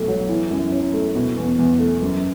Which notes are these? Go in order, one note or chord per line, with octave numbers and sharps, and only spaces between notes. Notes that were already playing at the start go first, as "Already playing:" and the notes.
Already playing: B1 B2 A3
F#3
E3
F#2
C#4
A3
B2
E2
E2
A3
F#2